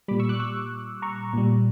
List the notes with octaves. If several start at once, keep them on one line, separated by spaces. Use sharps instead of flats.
A#2 G3 B5 D6
C#6 E6
D6 F#6
C#6 E6
A#5 C#6
A#2 G3